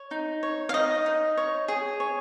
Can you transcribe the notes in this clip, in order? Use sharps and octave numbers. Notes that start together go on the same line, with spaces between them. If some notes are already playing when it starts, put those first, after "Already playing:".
Already playing: C#5
D#4
C#5
F5
D#4 D#5
D#4
C#5
G#4
C#5